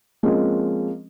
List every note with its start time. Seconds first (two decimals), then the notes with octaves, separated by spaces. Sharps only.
0.23 F3 G#3 A#3 C4 C#4